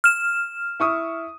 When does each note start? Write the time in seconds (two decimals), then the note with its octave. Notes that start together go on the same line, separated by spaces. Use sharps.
0.04 F6 E7
0.80 E4 C#6 D#6